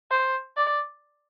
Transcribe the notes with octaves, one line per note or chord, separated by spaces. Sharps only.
C5
D5